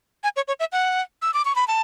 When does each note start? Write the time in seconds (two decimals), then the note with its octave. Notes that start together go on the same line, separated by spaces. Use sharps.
0.24 G#5
0.36 C#5
0.48 C#5
0.60 E5
0.72 F#5
1.22 E6
1.34 D6
1.45 C#6
1.56 B5
1.68 A5